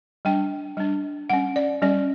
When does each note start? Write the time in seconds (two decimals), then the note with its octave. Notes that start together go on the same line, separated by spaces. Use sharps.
0.25 G3 D4 G5
0.77 G3 D4
1.30 G3 C#4 F#5
1.56 D5
1.82 G3 C#4 D5